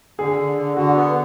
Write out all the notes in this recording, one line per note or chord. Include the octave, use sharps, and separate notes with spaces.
D3 G#4
D3
D3
D3 F#4
B3